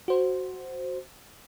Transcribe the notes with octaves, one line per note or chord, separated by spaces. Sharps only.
F#4 C5